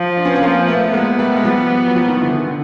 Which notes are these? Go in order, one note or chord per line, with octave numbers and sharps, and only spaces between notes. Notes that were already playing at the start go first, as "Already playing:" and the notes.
Already playing: F3
D4
B3 C#4
C#4
F3 A#3 C4
A3 B3
G#3 A#3 B3
G3 A3
G#3
F3 G3
F#3
F3 G3
D#3 F3
D3 E3
D#3
D3